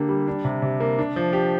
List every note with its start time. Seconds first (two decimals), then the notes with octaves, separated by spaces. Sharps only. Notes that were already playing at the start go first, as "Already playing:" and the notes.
Already playing: D3 A#3 G4
0.09 G3
0.27 D4
0.45 C3
0.62 C3
0.80 A#3
0.99 D4
1.16 F3
1.33 G4